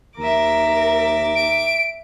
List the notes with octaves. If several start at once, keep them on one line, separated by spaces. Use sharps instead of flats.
D#2 A#4 E5 D6
D7